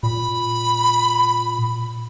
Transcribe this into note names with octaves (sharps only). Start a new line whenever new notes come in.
A#2 B5